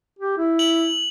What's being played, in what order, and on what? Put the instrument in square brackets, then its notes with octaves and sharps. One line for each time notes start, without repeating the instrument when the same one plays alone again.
[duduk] G4
E4
[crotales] F#7